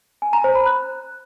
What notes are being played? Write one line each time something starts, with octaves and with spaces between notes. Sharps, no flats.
G#5
A#5
C5
B5
F#6